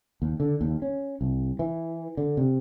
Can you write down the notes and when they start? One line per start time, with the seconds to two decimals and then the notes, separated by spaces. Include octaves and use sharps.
0.22 D#2
0.40 D3
0.61 D#2
0.82 C#4
1.21 C2
1.59 E3
2.17 D3
2.37 C3